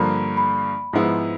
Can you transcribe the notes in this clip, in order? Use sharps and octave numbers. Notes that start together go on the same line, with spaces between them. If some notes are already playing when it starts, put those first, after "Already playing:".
Already playing: G2 D3 F3 A#3 B5
B5
G#2 F3 G#3 B3 E4